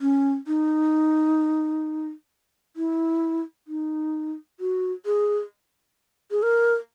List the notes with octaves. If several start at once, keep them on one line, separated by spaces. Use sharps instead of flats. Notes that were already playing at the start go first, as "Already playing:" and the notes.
C#4
D#4
E4
D#4
F#4
G#4
G#4
A#4